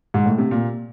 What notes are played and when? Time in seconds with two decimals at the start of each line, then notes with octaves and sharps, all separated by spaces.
0.14 G#2
0.26 A2
0.38 C3
0.51 A#2